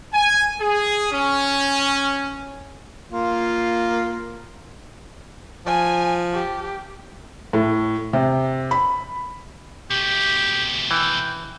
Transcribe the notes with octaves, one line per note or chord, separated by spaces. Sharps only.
G#5
G#4
C#4
A#3 F4
F3 G#5
G4
A2
C3
B5
B2 A3 G4
E3 G5